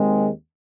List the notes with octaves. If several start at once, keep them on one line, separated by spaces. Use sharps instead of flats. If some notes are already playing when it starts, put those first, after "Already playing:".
Already playing: D#2 D#3 G#3 C4